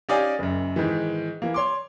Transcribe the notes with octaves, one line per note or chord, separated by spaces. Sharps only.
C#4 D#4 G4 D5 F5 G#5
F#1 F#2
G#2 D#3 E3
E3 A#3
C#5 C6 D6